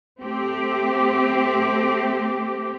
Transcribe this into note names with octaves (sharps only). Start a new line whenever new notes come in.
A3 C4 G4